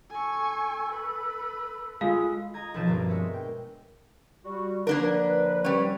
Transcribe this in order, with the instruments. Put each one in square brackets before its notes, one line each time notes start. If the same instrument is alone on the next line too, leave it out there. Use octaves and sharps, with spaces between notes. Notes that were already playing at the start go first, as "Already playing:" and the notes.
[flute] A4 [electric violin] G#5 C#6
[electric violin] B4
[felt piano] G#3 [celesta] F4 F5
[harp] D#5 A#5 G#6
B1 F3 B4 A5 D7 E7
G2 B2 F3 A#3 C4 D4
G#3 C#5 E5
G5
[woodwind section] G3 F#4
[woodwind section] D3 F3 B4 [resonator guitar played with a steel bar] A#3 D4 A#4
[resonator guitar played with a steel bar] G3 C#4